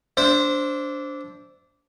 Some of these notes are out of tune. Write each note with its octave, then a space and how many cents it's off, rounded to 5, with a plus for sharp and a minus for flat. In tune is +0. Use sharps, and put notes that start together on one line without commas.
D4 -15 C5 +0 E5 +0